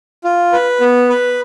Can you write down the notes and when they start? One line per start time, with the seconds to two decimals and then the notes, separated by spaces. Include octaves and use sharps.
0.24 F4
0.52 B4
0.81 B3
1.10 B4